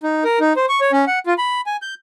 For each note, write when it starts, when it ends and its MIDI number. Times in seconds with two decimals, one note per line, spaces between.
0.03 0.24 63
0.24 0.39 70
0.40 0.53 63
0.56 0.66 72
0.69 0.80 85
0.81 0.92 73
0.92 1.05 61
1.07 1.19 78
1.26 1.34 65
1.38 1.61 83
1.66 1.77 80
1.82 1.94 91